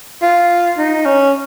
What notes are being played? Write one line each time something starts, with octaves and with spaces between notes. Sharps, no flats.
F4
D#4
C#4